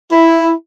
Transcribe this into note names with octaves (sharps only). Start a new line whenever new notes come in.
E4